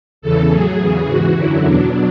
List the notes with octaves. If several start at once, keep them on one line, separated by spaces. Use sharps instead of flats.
E2 C#3 E3 A4
A2 F#3 G#4
E2 C#3 E3 G#4
G#2 E3 F#4
F#2 D3 F#3 E4
E2 B2 F#3 D4